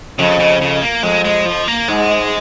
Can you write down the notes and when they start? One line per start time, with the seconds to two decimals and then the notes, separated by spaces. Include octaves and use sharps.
0.19 F2 C#3
0.40 C#3
0.61 C#3
0.82 A#3
1.03 F2 G#3
1.25 G#3
1.46 F3
1.68 A#3
1.88 G#2 G#3